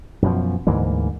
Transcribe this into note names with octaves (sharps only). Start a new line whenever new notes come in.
F#2 B2 F3
D2 G#2 E3 A#3